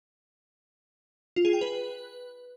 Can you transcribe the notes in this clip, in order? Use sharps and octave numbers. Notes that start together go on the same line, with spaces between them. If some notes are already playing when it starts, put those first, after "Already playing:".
F4
G#4
G5
B4